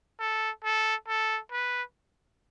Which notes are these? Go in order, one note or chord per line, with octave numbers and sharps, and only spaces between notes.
A4
A4
A4
B4